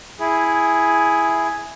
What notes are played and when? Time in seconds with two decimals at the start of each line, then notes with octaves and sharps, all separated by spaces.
0.19 E4 G#4